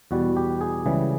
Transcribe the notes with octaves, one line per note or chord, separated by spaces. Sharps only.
E2 B2 G3 F#4
G4
G#4
C#2 C#3 E3 G3